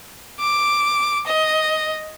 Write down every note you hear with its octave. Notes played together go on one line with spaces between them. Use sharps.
D6
D#5